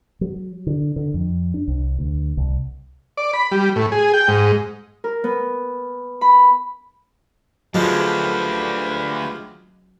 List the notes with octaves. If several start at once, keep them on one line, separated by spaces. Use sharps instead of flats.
F#3
D3
D3
F2
D4
C2
D2
C2
D5
B5
G3
A2
G#4
G5
G#2
A#4
B3
B5
D2 D3 F3 F#3 G#3 G4 B4 F5